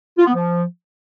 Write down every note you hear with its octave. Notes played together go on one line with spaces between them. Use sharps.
F4
B3
F3